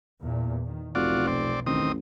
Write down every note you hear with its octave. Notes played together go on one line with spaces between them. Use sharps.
E2 A#2
D#3
F1 B1 E2 F4 F#4 D5
C4 D5
A1 D#3 C4 D#6